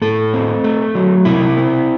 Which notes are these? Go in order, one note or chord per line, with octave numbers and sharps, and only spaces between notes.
A2 A4
C4
A3
F#3
C3 E4
C4